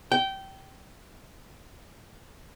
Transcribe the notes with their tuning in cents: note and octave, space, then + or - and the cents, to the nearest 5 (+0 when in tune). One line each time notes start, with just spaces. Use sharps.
G5 -20